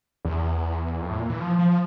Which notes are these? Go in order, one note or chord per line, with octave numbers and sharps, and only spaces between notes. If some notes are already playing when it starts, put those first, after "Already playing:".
E2
F2
A2
A#2
E3
F3
F3